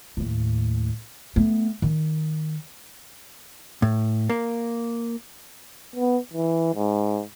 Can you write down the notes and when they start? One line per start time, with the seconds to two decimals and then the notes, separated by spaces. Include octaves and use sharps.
0.17 D#2 A2
1.36 A3 B3
1.82 D#3
3.82 A2
4.30 A#3
5.96 B3
6.33 E3
6.75 G#2